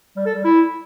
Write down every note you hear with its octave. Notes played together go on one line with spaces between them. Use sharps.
G3
A4
G3
E4